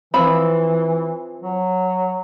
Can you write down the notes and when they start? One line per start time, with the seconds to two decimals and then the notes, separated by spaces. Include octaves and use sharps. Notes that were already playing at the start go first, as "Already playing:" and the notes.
0.14 E3 F3 C4 B5
1.43 F#3